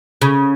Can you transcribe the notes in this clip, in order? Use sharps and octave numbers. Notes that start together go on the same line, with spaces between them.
C#3